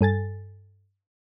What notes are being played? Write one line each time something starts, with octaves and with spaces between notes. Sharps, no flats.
G2 A4 G#5 A6